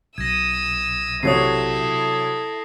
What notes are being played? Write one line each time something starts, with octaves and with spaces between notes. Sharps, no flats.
B1 D#6 E6 G#6 A#6
C3 F#3 E4 A4 C#5 D#6 G#6 C7